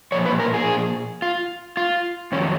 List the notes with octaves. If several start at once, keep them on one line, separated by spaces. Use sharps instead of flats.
A#2 F3 C#5
B4
A#4
G#4
F4
F4
F2 D#3 F#3 C#4